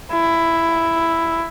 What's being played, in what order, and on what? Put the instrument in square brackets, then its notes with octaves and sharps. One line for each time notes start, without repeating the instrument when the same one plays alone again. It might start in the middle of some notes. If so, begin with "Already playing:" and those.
[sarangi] E4